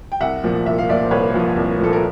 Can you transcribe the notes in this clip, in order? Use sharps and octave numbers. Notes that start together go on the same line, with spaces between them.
G5
C2 E5 F#5
A#2 F3
C2 E5
F5
A#2 F3 D5 E5
C5
C2 B4 C#5
A#2 F3
C2
A#2 F3 A4
A#4